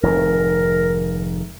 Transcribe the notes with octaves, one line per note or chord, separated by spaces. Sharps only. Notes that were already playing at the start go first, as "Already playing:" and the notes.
F1 G#2 D#3 A#4